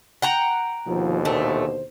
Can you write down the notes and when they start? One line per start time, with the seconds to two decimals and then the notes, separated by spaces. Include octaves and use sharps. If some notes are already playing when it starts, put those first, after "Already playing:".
0.22 F#5 G5 A#5
0.87 D#2 B2 D3 F3
1.25 A#2 A3 C5